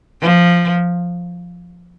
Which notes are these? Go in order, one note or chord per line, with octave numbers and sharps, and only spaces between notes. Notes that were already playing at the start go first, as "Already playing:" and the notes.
F3